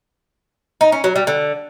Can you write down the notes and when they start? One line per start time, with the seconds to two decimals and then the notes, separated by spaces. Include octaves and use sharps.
0.81 D#4
0.92 C#4
1.04 F#3
1.16 G3
1.27 D3